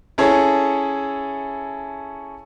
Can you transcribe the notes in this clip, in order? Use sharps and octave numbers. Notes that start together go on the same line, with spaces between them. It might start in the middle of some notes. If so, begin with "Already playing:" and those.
C#4 E4 G#4 A4 C#5